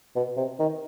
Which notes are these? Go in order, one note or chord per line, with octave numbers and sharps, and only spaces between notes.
B2
C3
D#3